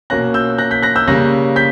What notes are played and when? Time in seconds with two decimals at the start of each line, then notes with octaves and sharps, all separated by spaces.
0.10 B2 A#3 C#4 F#6 A#6
0.34 E6 G6
0.58 F#6 A#6
0.71 G6 B6
0.83 F#6 A#6
0.96 E6 G6
1.08 C#3 G3 A#3 C#4 F#6 A#6
1.56 G6 B6